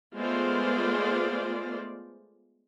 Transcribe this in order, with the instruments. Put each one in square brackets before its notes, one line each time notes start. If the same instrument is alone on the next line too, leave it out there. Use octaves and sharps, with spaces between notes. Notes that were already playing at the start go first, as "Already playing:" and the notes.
[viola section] G#3 A3 B3 F4 C5 D5